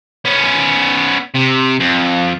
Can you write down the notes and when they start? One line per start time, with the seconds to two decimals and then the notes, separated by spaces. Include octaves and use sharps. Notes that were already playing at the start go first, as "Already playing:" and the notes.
0.25 B3 C#4
1.34 C3
1.80 F2